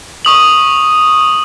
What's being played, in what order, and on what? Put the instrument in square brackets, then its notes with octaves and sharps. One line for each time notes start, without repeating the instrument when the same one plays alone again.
[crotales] C#6 D#6 F#7